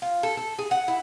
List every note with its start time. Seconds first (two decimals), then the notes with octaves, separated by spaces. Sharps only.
0.02 F4
0.23 A4
0.37 A4
0.59 G#4
0.71 F#5
0.88 E4